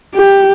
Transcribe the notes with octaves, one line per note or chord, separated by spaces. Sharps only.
G4